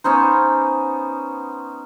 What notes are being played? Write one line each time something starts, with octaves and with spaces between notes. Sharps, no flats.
B3 C#4 D#4 C5